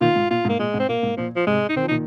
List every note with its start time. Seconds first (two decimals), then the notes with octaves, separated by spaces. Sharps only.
0.01 A#2 D#3 F4
0.16 G#2
0.31 A#2 F4
0.45 G#2
0.49 A#3
0.59 A#2 G#3
0.74 G#2
0.80 C4
0.89 A#2 A#3
1.03 G#2
1.17 A#2 F3
1.36 F3
1.47 G#2 C3 G#3
1.69 D#4
1.76 D#3 C4
1.84 F3
1.89 A#2 D#3 D#4